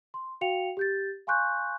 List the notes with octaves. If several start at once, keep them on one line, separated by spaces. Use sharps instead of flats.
C6
F#4 F5 G5 C#7 F7
G4 G6 A6
F5 G#5 C6 C#6 F#6 G6